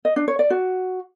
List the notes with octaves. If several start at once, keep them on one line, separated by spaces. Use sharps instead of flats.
D#5
D4
C#5
D5
F#4